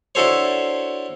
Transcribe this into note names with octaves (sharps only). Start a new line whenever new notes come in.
D4 E4 F#4 A4 C5 C#5